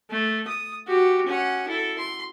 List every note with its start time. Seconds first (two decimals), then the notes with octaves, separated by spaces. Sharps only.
0.10 A3
0.48 D#6
0.87 F#4 G4
1.26 C#4 F#5
1.68 E4 A4
1.98 C6